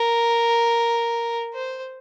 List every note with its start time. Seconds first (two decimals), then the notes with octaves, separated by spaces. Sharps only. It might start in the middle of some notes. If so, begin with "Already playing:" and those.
Already playing: A#4
1.54 C5